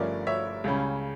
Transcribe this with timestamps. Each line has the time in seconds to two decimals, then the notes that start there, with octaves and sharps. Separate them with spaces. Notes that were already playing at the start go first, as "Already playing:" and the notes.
Already playing: G1 G2 F3 A3 C#4 A#4 D5
0.27 C#5 E5
0.64 C#2 C#3 G3 C#4